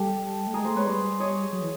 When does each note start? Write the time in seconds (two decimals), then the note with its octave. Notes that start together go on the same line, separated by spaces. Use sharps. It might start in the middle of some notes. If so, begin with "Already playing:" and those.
Already playing: G3 G4 A4
0.47 A3
0.54 G#3 G#4 A#4
0.65 A3 A#4 C5
0.76 G#3 B4 C#5
0.87 G3 C5 D5
1.20 C#5 D#5
1.53 F#3
1.61 E3